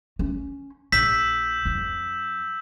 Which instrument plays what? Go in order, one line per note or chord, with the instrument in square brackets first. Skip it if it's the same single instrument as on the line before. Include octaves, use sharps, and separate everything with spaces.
[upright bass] C#4
[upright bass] A#1 [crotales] E6 G6 E7 [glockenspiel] B6
[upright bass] F2